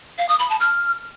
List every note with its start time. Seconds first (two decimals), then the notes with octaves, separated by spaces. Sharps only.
0.18 F5
0.29 D#6
0.39 B5
0.50 A5
0.60 F6